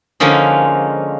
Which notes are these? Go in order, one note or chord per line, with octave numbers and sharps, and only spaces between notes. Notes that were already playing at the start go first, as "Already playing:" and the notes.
D3 F3 G#3 A#3 C#4 D#4